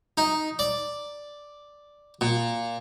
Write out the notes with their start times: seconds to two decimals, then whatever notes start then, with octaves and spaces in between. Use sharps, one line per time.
0.17 D#4
0.59 D5
2.21 A#2